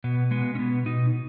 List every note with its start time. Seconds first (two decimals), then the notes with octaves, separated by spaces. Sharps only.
0.04 B2 B3
0.31 G#3 B3
0.55 C#4
0.59 B2 B3
0.86 B2 D#4